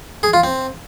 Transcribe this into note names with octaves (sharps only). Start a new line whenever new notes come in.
G#4
F4
C4